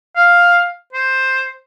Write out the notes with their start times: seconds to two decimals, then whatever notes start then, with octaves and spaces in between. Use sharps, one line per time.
0.16 F5
0.93 C5